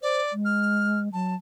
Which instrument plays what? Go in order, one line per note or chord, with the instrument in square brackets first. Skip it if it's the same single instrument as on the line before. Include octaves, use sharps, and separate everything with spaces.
[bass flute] C5 [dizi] D5
[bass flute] G#3
[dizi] F6
[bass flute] F#3 [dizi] A5